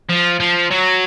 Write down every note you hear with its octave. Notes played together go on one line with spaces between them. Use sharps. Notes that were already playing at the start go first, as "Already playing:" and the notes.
F3
F3
F#3